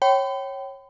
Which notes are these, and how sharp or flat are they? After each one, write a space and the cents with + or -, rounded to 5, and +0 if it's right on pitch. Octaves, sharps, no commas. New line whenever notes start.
C#5 -20 G5 -25 B5 +40